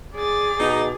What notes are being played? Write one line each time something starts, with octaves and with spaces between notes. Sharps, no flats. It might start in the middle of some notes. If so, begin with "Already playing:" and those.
G#4 D5 A6
B2 D#4